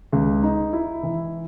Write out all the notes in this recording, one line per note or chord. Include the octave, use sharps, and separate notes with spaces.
C#2
D#4
E4
E3